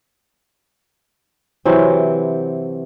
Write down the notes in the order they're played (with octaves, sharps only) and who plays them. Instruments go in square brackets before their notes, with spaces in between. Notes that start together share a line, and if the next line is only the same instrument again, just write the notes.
[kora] C3 E3 F#3 C4